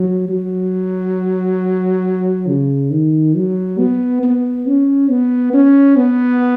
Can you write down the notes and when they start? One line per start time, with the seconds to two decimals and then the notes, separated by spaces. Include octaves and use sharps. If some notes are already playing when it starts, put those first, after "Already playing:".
Already playing: F#3
0.29 F#3
2.48 C#3
2.91 D#3
3.35 F#3
3.79 B3
4.23 B3
4.67 C#4
5.09 B3
5.53 C#4
5.97 B3